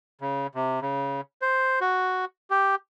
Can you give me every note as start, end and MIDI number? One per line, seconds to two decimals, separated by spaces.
0.21 0.47 49
0.55 0.80 48
0.82 1.21 49
1.42 1.79 72
1.81 2.25 66
2.50 2.75 67